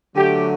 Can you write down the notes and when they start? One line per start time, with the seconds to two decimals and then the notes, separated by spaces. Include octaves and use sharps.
0.16 D3 F#3 A3 G4